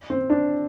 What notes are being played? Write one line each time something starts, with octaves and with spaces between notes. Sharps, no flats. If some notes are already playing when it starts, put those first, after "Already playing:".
C4
D4